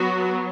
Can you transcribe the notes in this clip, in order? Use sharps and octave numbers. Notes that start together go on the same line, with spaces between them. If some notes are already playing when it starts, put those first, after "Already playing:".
Already playing: F#3 B3 F#4